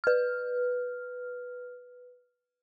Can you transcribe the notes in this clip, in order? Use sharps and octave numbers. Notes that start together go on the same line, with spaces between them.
B4 F6